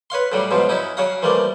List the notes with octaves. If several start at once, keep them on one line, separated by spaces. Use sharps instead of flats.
B4 C#5 F5 C6
A2 C#3 F#3 G3
G#2 B2 F3 F#3
F#3 C#4 D#4 E4
C#3 F#3 C#5 F5 A#5
E3 F3 G3 A3 A#3